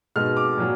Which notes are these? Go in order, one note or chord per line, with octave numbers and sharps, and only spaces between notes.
B2 G#3 D#4 F6
D6
A#2 F#3